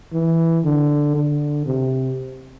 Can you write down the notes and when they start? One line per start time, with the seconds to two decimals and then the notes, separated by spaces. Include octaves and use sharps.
0.13 E3
0.64 D3
1.15 D3
1.66 C3